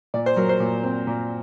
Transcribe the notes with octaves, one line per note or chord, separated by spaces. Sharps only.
A#2 D5
C5
F#3 A#4
C5
A#2
C4
A#2